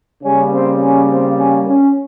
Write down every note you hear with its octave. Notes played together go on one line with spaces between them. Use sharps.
C#3 G3 A#3 C#4
C4
C#4
C4
C#4
C#4